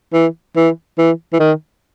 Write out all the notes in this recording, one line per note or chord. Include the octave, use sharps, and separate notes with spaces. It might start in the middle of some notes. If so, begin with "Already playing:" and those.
E3
E3
E3
E3
D#3